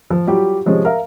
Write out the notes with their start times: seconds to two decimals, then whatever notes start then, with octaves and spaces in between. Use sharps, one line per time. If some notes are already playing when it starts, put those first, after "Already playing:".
0.10 F3
0.27 F#3 G3 F4 G4
0.66 C3 F3 G#3 C#4
0.85 A#4 E5 F5